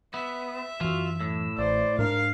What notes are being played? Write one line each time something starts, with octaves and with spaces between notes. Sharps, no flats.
B3 E5
F#2 E3 F4 F#4
A2 E6
A1 C5 D5
G#2 D4 A#4 F5